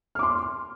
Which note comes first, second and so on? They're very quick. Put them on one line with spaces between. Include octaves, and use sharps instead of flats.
F6 D6 C6